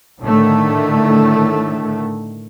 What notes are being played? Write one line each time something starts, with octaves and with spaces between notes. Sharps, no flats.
A2 D3 D#3 A3